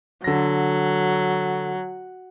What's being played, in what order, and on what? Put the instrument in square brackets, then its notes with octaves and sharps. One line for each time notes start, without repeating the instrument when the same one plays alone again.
[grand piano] D3 A#6 [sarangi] F#3